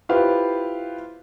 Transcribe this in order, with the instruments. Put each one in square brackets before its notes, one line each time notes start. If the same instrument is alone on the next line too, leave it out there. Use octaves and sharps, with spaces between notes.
[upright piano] E4 F4 G4 B4 C5 F5